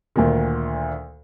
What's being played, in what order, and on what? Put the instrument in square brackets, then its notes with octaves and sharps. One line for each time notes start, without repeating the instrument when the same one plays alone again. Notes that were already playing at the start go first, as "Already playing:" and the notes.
[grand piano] D2 A#2 D#3